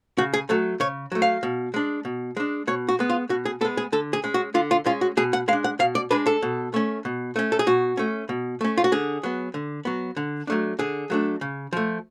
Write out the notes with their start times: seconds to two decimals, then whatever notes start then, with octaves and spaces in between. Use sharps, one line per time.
0.18 C#3 F#4
0.34 G#4
0.49 F#3 A3 A4
0.80 C#3 C#5
1.12 F#3 A3
1.22 F5
1.43 B2
1.74 G#3 D4
2.05 B2
2.37 G#3 D4
2.67 B2 C#5
2.89 F#4
2.99 G#3 B3
3.10 F4
3.29 B2 F#4
3.45 G#4
3.61 B3 A4
3.65 G#3
3.77 G#4
3.92 D3 A4
4.13 G#4
4.24 G#3 C#4
4.34 F#4
4.54 D3 F4
4.71 F4
4.86 G#3 C#4 F4
5.01 F#4
5.17 B2 G#4
5.33 F#5
5.48 G#3 F5
5.53 D4
5.64 F#5
5.79 B2 F5
5.95 D5
6.11 G#3 D4 B4
6.26 A4
6.42 B2
6.74 A3 C#4
7.05 B2
7.36 A3 C#4
7.52 A4
7.59 G#4
7.67 B2 F#4
7.97 A3 C#4
8.29 B2
8.61 A3 C#4
8.77 F4
8.84 F#4
8.92 D3 G#4
9.23 F#3 B3
9.54 D3
9.85 F#3 B3
10.17 D3
10.47 F#3 A3 D4
10.79 D3 G#4
11.10 F#3 A3 D4
11.41 C#3
11.73 F3 A3